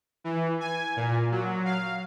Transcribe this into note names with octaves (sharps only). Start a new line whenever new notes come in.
E3
G#5
A#2
F#3
F5